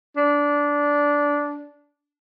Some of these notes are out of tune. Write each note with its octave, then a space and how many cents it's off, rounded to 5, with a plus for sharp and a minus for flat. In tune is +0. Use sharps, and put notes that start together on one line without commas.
D4 -15